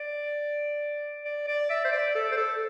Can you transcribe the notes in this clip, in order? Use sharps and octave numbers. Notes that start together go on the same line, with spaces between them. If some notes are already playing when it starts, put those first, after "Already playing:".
Already playing: D5
D5
D5
E5
C5
D5
A4
C5
A4